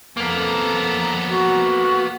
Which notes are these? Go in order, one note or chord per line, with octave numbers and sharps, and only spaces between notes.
F2 A#3 B3 A4 A#5
F#4